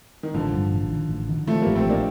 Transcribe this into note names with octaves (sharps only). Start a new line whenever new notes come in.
D#3
A1 D3 F3
G2
A1
D#3
A1
D#3
D#3 F3 A3
A1 G3 A#3
A3 C4
A1 A#3 D4